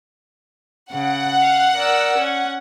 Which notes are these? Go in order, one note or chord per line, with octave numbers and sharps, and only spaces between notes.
C#3 F#5
F5
A#4 D5 E6
C#4